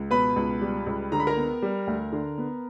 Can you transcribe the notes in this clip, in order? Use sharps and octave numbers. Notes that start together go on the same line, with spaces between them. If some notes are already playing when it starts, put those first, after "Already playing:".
Already playing: C#2
B2 B4 B5
C#2
G3
C#2
D3 A#5
B5
A#4 A#5
B3
G3
D2
D3
B3